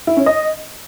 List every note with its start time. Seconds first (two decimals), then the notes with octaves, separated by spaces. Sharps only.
0.07 E4
0.17 C#4
0.26 D#5